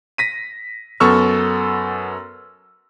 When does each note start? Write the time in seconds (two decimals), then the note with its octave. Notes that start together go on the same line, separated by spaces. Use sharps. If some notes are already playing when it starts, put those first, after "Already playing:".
0.18 A#6 B6 D#7
1.00 F#2 B3 A4 C#6 E6 F6